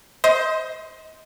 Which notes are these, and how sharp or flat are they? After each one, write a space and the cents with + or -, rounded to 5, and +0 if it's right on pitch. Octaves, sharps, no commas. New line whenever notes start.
C5 +0 D#5 +35 C6 +0